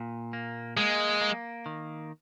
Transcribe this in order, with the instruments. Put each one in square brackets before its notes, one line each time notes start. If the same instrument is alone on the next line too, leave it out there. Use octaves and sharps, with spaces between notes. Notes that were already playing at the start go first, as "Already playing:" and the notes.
Already playing: [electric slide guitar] A#2
A#3
[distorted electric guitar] G#3 [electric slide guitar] A#3
[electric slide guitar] A#3
D#3